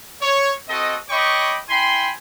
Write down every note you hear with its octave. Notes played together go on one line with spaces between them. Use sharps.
C#5
C4 F#4 A4 D#5
C#5 D#5 G5 B5 C#6 D6
E4 G5 G#5 B5 C6